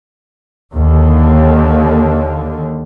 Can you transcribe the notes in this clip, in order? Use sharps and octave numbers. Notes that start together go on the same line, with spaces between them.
D#2 D3